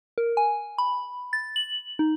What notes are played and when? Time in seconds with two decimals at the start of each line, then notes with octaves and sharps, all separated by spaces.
0.18 A#4
0.37 G#5
0.78 B5
1.33 A6
1.56 F#7
1.99 D#4